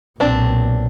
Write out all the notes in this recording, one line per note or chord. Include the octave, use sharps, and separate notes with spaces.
B1 A#2 C4 D4